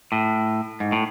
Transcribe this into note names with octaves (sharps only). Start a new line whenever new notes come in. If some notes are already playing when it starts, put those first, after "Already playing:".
A2
G#2
A2